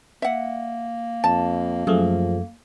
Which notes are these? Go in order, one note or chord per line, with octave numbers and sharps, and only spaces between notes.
A#3 E5 F#5
F2 A5
F#2 F3 A3 G#4